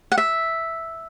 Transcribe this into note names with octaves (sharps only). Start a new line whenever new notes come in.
F#5
E5